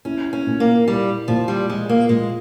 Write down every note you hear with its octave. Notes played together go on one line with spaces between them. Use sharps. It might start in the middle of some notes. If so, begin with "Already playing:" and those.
C#4 E4
C#4
A#2
A#3
G3 E4
A#2 F3
G3
F3 G#3
A#3
A#2 G#3